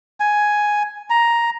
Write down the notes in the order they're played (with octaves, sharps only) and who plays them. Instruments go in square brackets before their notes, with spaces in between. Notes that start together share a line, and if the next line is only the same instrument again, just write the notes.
[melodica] G#5
A#5